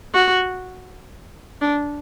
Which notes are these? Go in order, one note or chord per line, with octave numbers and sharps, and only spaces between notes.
F#4
D4